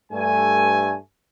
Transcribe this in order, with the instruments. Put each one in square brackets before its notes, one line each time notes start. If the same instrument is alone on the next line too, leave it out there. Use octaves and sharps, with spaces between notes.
[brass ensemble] G2 A3 G#5